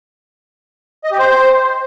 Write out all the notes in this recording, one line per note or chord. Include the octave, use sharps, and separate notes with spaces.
D#5
G4
C5